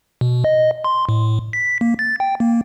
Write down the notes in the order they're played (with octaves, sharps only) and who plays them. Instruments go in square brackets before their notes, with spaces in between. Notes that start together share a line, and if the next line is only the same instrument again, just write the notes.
[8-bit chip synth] B2
D#5
C6
A2
B6
A#3
A6
G5
A#3